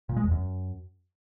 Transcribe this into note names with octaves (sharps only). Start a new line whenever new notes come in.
A#2
G#3
E2
F#2